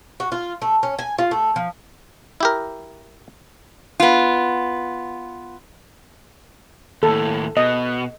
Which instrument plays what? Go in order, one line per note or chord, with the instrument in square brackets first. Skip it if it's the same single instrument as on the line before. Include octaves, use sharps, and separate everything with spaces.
[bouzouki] F#4
F4
A3
C#4
G#5
F4
A3
F3
[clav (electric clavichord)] E4 G4 A#4
[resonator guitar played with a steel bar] B3 F4
[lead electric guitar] D#2 A2 [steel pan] A4
[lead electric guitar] B2 [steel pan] D#5